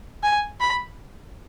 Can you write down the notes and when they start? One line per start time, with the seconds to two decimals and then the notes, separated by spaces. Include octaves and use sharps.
0.23 G#5
0.61 B5